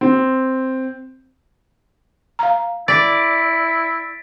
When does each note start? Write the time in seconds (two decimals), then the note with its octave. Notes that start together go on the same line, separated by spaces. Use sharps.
0.01 C4
2.39 F5 A#5
2.88 E4 D5 A6 B6 D7